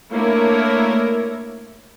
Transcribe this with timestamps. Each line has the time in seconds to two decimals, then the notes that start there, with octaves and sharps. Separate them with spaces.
0.11 A3 A#3 D4 E4 A#4 C#5